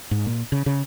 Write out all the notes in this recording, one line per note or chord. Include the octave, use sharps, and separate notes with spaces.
G#2
A#2
C#3
C#3